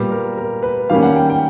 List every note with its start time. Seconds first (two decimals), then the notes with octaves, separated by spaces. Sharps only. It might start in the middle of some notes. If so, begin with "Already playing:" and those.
Already playing: A#2 G3 B3
0.11 A#4
0.37 A#4
0.63 B4
0.90 D#3 G3 A#3 C#4 F5
1.03 F#5
1.16 G5
1.30 G5